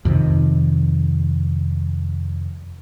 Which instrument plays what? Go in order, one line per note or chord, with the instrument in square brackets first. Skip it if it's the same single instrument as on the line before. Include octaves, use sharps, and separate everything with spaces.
[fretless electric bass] F2 C3 D#3